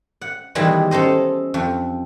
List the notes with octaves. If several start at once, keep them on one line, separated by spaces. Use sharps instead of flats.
F#5
B2 D#3 E3 G3 G#3
C#4 A4 C5 D#5
F2